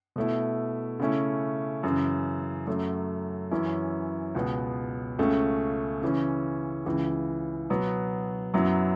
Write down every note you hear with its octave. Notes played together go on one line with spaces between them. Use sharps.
B2 A3 E4
C#3 A3 C#4 E4
F#2 C#3 E3
F#2 F#3 A3
F#2 E3 C#4 E4
C#2 B2 B3
C#2 C#3 A3 C#4
C#3 E3 C#4
C#2 C#3 E3
B2 F#3 B3
F#2 F#3 B3 E4